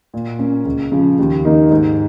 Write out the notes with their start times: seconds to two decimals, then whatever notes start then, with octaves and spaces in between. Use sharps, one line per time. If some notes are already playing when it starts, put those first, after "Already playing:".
0.14 A#2
0.39 A#3 C#4
0.65 C#2
0.92 C#3 F3
1.19 D#2
1.45 D#3 A#3 D#4
1.71 G#2